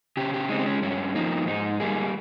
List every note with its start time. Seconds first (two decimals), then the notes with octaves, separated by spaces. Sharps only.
0.17 C#3 G4
0.34 G4
0.49 G#3 C4 D#4
0.59 C4
0.66 C#4
0.82 G2 C#4
1.15 F3 A#3 D#4
1.47 G#2 D#4
1.80 G3 A#3 G#4